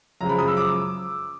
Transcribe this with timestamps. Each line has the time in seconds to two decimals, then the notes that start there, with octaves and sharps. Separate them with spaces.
0.21 F#2 C#3 F3 G#3 A#5
0.29 B5
0.39 D#6
0.48 E6
0.57 D6